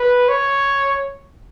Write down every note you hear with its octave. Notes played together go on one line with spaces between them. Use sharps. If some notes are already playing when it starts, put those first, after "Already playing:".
Already playing: B4
C#5